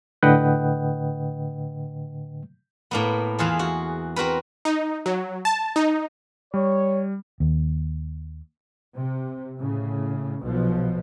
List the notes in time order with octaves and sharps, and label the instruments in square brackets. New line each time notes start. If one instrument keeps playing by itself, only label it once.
[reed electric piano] A2 D3 B4 D#5 F#5 G5
[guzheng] A2 A#3 B3
E2 E3 F4 G#4
F#4
C4 F#4 A#4 B4
[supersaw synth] D#4
F#3
A5
D#4
[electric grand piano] G3 [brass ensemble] C#5
[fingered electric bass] D#2
[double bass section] C3
A2 C#3
B1 B2 F3